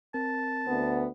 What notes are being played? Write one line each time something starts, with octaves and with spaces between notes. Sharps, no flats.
C4 A#4 A5
D2 B3